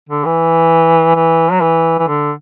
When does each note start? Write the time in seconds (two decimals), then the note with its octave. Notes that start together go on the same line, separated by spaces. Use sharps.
0.09 D3
0.25 E3
1.15 E3
1.52 F#3
1.61 E3
1.99 E3
2.08 D3